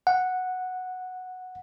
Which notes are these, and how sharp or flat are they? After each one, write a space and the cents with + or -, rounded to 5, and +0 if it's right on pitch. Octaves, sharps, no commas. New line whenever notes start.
F#5 -5